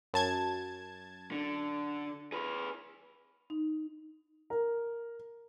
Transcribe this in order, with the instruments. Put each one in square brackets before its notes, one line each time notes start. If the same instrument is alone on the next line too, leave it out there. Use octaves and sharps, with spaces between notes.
[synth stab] F#2 A5 G#6
[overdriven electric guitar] D3
G#4 B4
[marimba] D#4
[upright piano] A#4